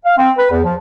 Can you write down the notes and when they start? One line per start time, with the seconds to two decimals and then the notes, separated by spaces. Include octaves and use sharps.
0.05 F5
0.18 C4
0.38 B4
0.50 E2
0.64 F3